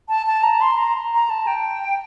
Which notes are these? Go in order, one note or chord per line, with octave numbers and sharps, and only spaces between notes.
A5
A5
A#5
C6
A#5
A#5
A5
G5